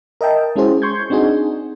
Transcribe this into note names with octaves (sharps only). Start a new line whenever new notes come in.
A#4 D#5 E5 G5 A5
G#3 C#4 E4 F#4 G#4 C5
C6 C#6 G6 G#6
C4 D4 D#4 F#4 G#4